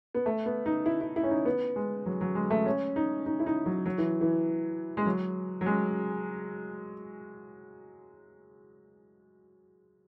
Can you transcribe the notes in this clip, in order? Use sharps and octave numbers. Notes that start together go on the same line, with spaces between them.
B3
A3
B3
D#4
E4
E4
E4
C#4
D#4
B3
G#3
F#3
F#3
G#3
A3
C#4
D#4
D#4
E4
D#4
F#3
F#3
E3
E3
G#3
F#3
F#3
G#3